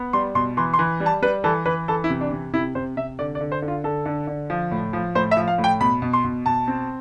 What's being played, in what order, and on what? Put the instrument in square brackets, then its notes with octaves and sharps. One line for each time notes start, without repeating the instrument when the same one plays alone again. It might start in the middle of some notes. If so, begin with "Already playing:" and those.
Already playing: [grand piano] B3
G3 C6
B2 C6
E3 C6
C6
E3
G3
A5
G3 B4
E3 A4
E3 B4
E3 A4
E4
C3
D4
C3
C3 E4
C3 C5
C3 E5
D3 D5
D5
D3
C5
D3
F4
D3 A4
D3
D3
F3
A2
F3
A2 C5
E5
F3
F5
A2
G5
B2 B5
B2
C6
B2
B2 A5
C4